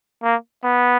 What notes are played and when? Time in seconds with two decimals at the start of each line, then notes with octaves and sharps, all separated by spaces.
0.23 A#3
0.64 B3